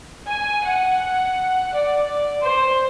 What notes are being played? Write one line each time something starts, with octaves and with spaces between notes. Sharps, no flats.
G#5
F#5
D5
C5